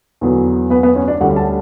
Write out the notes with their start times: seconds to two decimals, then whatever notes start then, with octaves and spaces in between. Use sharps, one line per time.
0.21 E2 D3 F#3 B3
0.70 B3 B4
0.83 B3 B4
0.95 C#4 C#5
1.08 D4 D5
1.21 D2 D3 G3 C#4 F#4 F#5
1.36 A4 A5